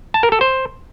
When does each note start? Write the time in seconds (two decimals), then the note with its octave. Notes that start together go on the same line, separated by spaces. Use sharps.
0.14 A5
0.23 A#4
0.32 A4
0.41 C5